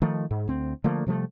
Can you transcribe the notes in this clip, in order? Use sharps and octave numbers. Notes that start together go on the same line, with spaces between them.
D#3 F3 A3
G#2
D2 C4
D3 F3 A3 A#3
C3 F3 G3 A3